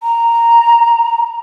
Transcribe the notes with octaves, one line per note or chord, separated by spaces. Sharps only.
A#5